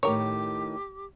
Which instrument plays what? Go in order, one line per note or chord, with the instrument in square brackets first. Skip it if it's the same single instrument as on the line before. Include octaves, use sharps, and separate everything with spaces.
[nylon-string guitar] A2 D#3 [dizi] G4 [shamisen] A#4 C#5